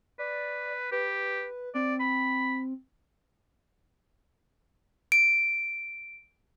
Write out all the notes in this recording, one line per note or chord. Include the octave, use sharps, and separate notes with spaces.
B4 D5
G4 B4
C4 D5
B5
D7